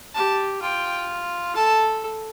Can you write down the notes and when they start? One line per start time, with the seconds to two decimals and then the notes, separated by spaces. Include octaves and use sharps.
0.15 G4 A5
0.62 F4 G5
1.56 A4 A5